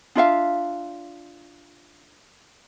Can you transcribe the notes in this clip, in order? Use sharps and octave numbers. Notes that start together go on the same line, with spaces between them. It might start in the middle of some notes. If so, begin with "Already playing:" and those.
D4 F4 E5 F5